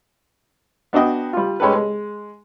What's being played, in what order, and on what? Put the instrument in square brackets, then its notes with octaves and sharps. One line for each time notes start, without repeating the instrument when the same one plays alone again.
[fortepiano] B3 D4 F#4 D#5 G5
G3 F4
G#3 C#4 G4 A4 B4
G#3